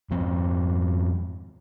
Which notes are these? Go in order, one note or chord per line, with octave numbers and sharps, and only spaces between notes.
F2 G#2 F3 C4